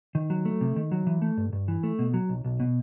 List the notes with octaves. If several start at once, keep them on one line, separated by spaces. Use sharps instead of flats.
D#3
F#3
A3
C3
D#3
F#3
E3
A3
G2
G2
E3
A3
B2
F#3
B1
B1
B2